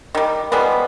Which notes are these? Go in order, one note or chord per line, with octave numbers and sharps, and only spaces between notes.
D#3 G3
F3 G3 G#3 B3